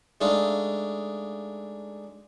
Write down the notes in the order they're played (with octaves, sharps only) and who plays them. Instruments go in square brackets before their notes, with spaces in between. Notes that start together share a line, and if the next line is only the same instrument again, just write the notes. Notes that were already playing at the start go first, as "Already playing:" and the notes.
[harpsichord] G#3 A3 D4 D#4 F5